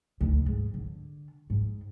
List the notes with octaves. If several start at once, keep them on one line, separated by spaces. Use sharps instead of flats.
D2
G#2
D3
G#2